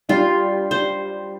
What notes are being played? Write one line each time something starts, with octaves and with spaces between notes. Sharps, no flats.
G3 D4 F4 G4
C5